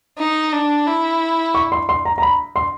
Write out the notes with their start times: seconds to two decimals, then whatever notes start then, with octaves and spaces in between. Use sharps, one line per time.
0.18 D#4
0.53 D4
0.87 E4
1.55 C#6
1.72 C6
1.89 C6
2.05 A#5
2.18 A#5
2.22 B5
2.56 C6